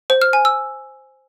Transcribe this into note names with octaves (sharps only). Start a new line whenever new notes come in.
C5
F6
G#5
E6